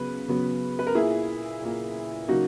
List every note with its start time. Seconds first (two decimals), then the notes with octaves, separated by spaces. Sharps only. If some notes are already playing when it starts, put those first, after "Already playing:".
Already playing: C#3 F#3 B3 B4
0.28 C#3 F#3 B3
0.79 B4
0.87 A#4
0.95 A#2 A#3 E4 G#4
1.62 A#2 A#3
2.28 C#3 F#3 A#3 D#4 F#4